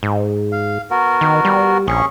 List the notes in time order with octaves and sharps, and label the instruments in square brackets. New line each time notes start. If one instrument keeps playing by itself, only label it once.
[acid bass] G#2
[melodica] F5
B3 F#4 A#4
[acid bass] D#3
G3
[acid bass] A#1 [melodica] C#4 G#4 C#6